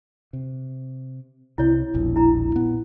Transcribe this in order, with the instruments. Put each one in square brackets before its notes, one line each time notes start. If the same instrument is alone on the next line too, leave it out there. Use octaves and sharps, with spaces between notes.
[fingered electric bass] C3
[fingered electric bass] C2 C3 [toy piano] E4 C#5
[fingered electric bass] E1 A#1 B2
[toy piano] E4 A#5
[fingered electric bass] A#2 B3